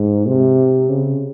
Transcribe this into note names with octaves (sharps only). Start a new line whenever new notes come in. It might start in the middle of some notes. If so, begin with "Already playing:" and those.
Already playing: G#2
C3
C#3